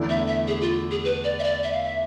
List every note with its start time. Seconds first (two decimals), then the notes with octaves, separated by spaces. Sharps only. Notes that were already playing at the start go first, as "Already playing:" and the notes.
Already playing: E2 D3 A3 E4
0.09 E5
0.28 E5
0.48 G#4
0.61 F4
0.91 G#4
1.05 B4
1.24 D5
1.39 E5
1.44 D5
1.63 E5
1.73 F5
1.83 E5